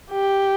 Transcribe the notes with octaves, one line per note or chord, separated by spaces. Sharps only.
G4